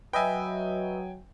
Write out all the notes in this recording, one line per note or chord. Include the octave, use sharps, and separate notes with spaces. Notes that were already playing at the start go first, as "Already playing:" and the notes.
F#3 B4 D#5 E5 G5 G#5